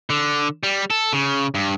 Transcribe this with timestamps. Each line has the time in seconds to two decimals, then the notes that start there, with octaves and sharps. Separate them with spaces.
0.10 D3
0.63 G3
0.90 A4
1.13 C#3
1.55 G2